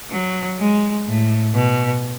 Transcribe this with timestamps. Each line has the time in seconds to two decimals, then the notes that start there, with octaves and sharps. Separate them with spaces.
0.10 F#3
0.59 G#3
1.07 A2
1.55 B2